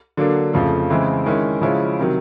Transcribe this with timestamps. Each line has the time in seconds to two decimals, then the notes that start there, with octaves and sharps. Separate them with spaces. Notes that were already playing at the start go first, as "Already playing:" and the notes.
0.17 D3 F#3 A#3 D4
0.53 F2 C#3 F3 A3
0.90 C#3 E3 G#3 C4 E4
1.26 D#3 G#3 C#4 E4
1.61 C#3 F3 G#3 C#4 E4
1.99 C3 D#3 F#3